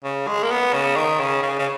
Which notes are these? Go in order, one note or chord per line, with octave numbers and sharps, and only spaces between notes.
C#3
G#3
A#3
B3
C#3
D#3
C#3
C#3
C#3